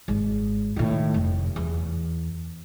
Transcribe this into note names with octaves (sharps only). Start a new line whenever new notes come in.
G#1
A2 D#3
F1
E2